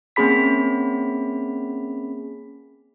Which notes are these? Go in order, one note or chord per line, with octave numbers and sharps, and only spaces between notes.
A#3 C4 C#4 G#4 B5 B6